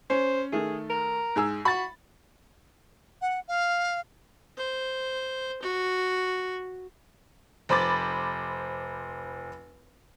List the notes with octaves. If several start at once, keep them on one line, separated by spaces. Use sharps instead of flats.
C#4 C5
D#3 A3 G#4
A#4
G#2 G#4 E6
F#4 B5 A6
F#5
F5
C5
F#4
F1 C5 B5 D6 A6